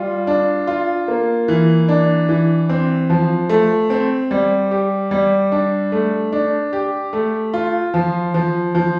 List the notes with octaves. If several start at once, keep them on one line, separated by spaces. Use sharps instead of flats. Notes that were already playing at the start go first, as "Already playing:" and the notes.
Already playing: G3 F4
D4
F4
A#3
E3
D4
E3
C4
F3
A3
C4
G3
G4
G3
D4
A3
D4
G4
A3
F4
F3
F3
F3